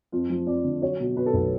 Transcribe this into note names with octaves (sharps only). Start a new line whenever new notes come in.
F2 F4
F3
F2 D5
D3
F#3 C#5
B2
B2 B4
A4
B1 B4